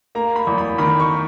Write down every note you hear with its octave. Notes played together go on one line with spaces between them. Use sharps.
A#3 A#5
B5
E2
B5
D#3 B5
C#6